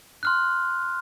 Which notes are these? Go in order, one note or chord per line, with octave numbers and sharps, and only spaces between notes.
C6 F6 F#6